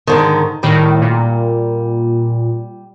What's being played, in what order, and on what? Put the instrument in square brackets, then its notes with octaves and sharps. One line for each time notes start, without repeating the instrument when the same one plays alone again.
[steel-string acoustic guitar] G#2 D3 D#3
[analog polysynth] A2 D#3 [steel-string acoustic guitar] G3
[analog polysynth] A#2